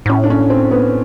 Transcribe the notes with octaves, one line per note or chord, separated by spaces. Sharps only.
G#2
A2 C#4
D4
C#4
C4
B3